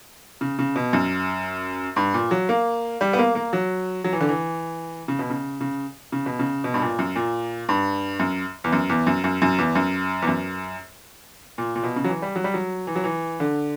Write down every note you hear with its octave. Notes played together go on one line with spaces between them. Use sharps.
C#3
C#3
B2
F#2
G2
A#2
F#3
A#3
G3
B3
A#3
A#3
F#3
F#3
E3
D3
E3
C#3
B2
C#3
C#3
C#3
B2
C#3
B2
G2
A#2
F#2
A#2
G2
F#2
E2
F#2
E2
F#2
F#2
F#2
E2
F#2
E2
F#2
A#2
A#2
B2
C#3
F#3
E3
G3
F#3
G3
F#3
E3
F#3
E3
D3